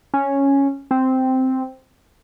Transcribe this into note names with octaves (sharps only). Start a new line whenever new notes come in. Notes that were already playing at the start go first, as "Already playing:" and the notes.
C#4
C4